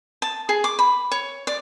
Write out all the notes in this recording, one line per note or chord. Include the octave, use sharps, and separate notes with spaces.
A5
G#4
D6
B5
C#5
D5